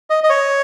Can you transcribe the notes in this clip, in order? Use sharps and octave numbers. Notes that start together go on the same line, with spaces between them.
D#5
D#5
C#5